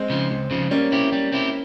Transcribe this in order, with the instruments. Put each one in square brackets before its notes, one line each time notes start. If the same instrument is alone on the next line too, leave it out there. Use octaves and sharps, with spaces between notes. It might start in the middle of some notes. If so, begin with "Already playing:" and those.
Already playing: [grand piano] G#3 C4
[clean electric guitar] C#3 F3
C#2
C#3 F3
[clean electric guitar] G3 [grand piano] A#3 C#4
[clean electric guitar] C4 E4 G4
G3
C4 E4 G4